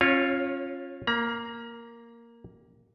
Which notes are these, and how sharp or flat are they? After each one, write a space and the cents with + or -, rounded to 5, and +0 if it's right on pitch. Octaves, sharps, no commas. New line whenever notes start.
C#4 -30 F4 +5 C#5 +0
A#3 +0 A#5 +40